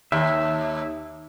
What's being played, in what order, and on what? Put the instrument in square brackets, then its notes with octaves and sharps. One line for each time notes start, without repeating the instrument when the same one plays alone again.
[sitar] D#2 [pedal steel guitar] E5